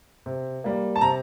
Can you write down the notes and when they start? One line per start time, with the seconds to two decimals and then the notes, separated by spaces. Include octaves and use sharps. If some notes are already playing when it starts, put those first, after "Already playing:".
0.26 C3
0.64 G3 A#3
0.96 A5
1.01 C3 A#5